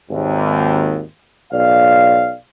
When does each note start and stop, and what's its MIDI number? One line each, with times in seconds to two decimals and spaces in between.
0.10 1.01 32
0.10 1.01 39
1.53 2.34 35
1.53 2.34 74
1.53 2.34 77